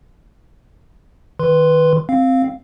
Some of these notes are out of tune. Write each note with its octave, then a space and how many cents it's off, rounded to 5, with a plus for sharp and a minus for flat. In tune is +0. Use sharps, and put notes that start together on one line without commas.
D#3 +0 B4 +0 C6 -5
C4 +0 F5 +0